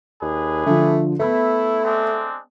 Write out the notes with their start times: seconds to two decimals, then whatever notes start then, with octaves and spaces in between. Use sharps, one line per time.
0.22 D#2 D4 G#4 B4
0.66 D3 F3 A3
1.20 A3 B3 E4
1.85 G#3 C4 D4